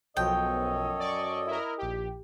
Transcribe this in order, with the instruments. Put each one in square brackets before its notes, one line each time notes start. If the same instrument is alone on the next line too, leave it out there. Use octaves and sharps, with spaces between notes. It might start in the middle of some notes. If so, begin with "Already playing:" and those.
[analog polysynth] B1 B2 F3 [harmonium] F#2 A4 C#5 [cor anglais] D#5 [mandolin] G5
[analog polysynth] D5 C#6
E4 A#4
A#1 G4